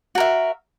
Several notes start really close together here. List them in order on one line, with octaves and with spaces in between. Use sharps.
F#4 A#4 E5